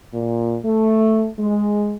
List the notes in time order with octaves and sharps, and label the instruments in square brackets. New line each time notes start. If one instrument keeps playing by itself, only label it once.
[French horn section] A#2
A3
G#3